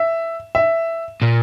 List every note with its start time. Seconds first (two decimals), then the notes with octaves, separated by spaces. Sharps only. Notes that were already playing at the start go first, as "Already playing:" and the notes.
Already playing: E5
0.55 E5
1.22 A#2